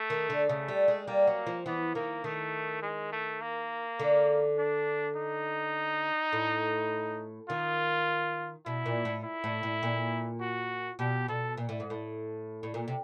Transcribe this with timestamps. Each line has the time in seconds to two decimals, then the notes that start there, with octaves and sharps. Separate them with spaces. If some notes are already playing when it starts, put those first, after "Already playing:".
Already playing: A3
0.10 D#3
0.30 D3
0.49 C#3 A3
0.68 G3
0.88 G#3
1.08 G3 A#3
1.27 F#3
1.46 F3
1.66 E3 B3
1.95 D#3 A#3
2.24 D#3 A3
2.82 G#3
3.12 A3
3.41 A#3
3.99 D3
4.58 D4
5.16 D#4
6.33 A2
7.49 D#3 F4
8.66 B2 E4
8.86 A#2
9.05 A2
9.24 E4
9.44 A2
9.63 A2
9.83 A#2
10.41 F#4
10.99 B2 G4
11.28 B2 A4
11.57 A#2
11.69 A2
11.80 G#2
11.90 A2
12.63 A2
12.74 A#2
12.88 C3